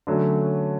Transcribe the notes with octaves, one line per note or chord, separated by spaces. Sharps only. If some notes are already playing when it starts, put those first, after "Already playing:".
D3 F#3 A3 C#4